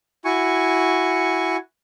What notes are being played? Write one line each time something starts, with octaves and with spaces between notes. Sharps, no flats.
E4 F#4 G#5 C#6